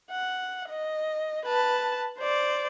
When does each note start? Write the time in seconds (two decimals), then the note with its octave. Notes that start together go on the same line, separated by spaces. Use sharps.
0.11 F#5
0.69 D#5
1.45 B4 A5
2.19 C5 D5